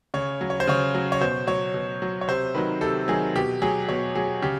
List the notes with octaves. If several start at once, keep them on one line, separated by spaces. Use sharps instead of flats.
C#3 C#5
F#3
C#5
C5
C#3 C#5
F#3
C#5
B2 C5
F#3 C#5
B2
F#3
C#5
C3 C5
D#3 F#3 B4
C3 A4
D#3 F#3 G#4
B2 G4
F#3 G#4
B2 C#5
F#3 G#4
C#3 G4